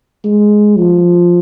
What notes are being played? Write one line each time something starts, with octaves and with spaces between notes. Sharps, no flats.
G#3
F3